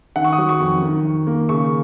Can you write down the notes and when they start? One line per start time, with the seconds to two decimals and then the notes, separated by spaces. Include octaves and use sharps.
0.16 D#3 F#5
0.24 C#6
0.32 D#6
0.38 F#3
0.49 C#6
0.60 F2
0.82 D#3
1.05 D#3
1.27 A#3
1.49 C#3 C#6